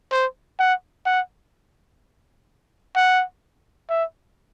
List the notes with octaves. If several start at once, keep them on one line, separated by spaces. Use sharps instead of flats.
C5
F#5
F#5
F#5
E5